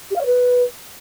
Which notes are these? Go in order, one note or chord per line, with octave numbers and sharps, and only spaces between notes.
G4
F5
C#5
B4